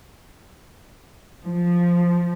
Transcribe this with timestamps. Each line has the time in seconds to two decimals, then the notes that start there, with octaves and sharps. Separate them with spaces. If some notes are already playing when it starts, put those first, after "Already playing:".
1.45 F3